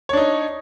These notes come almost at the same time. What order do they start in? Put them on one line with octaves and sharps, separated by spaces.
C#5 D4 D#4